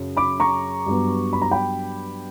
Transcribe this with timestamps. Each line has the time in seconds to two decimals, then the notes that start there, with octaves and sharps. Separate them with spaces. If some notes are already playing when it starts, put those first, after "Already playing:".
Already playing: F#2 C#3
0.17 B5 D6
0.40 A#5 C#6
0.87 G2 F#3 B3
1.33 B5
1.42 A#5
1.51 G5 B5